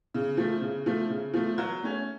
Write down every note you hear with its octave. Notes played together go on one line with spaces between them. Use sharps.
C#3
F3 A3
C#3
F3 A3
C#3
F3 A3
F#3
A3 C#4